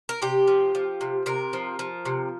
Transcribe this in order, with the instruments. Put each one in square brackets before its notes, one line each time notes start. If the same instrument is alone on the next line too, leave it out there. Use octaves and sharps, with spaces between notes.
[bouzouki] A#4
C3 G4
F3
F3
C3
C3 A#4
F3
F3
C3